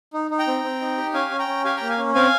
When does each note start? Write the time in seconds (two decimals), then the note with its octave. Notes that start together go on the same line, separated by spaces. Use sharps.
0.14 D#4
0.31 D#4
0.39 G5 A#5
0.47 C4
0.64 C4
0.81 D#4
0.97 G4
1.14 C#4 F5 G#5
1.30 C#4
1.39 G5 A#5
1.48 C#4
1.65 G4 F5 G#5
1.77 A#3 G5 A#5
1.89 F5 G#5
1.98 C#4
2.15 C4 F5 G#5